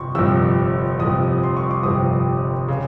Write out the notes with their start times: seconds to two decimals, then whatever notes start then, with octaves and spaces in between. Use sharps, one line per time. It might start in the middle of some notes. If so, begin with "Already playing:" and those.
Already playing: G1 F2 C3 F3 C6 C#6
0.15 G1 F2 C3 F3 E6
0.99 G1 F2 C3 F3 D#6
1.43 C6
1.57 C#6
1.71 D6
1.83 G1 F2 C3 F3 D#6
2.68 C#3